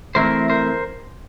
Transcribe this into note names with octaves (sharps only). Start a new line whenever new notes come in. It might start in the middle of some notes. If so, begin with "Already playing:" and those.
E3 A3 C4 E4 A#4 C5
A#4 C5